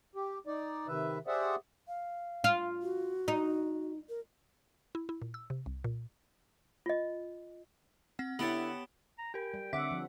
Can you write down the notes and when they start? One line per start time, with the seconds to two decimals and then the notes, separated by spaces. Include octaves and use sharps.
0.15 G4
0.47 D#4 D5
0.88 C3 D#3 B4 E5
1.27 G4 G#4 C5 D5 E5 F#5
1.88 F5
2.44 F4
2.82 F#4
3.28 D#4
4.09 A#4
4.95 E4
5.09 E4
5.22 A#2
5.34 E6
5.50 C3
5.66 C2
5.84 A#2
6.86 F4 D#5
8.19 C4 F#5
8.39 D3 B3 E4 G4 C#5 F#5 A5 F#7
9.18 A#5
9.34 G4 A#4 G5
9.54 G3
9.73 D3 C4 E5 F#5 D6
9.91 F3